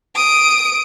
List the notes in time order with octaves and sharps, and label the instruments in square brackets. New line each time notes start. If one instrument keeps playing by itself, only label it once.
[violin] D#6 D7